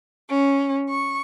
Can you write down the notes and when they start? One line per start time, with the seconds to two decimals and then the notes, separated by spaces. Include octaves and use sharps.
0.30 C#4
0.90 C#6